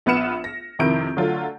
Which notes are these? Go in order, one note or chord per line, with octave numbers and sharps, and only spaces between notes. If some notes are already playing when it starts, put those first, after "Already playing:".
A#1 B3 B4 F6 C#7 E7
A#6
F2 C3 D#3 E4 G6 D7
D3 F#3 A3 F4